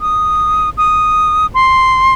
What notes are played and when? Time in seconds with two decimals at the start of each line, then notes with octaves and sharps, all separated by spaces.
0.01 D#6
0.77 D#6
1.54 C6